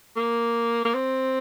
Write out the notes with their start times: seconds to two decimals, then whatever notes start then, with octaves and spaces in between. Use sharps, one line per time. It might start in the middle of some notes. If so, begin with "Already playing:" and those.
0.16 A#3
0.85 A#3
0.94 C4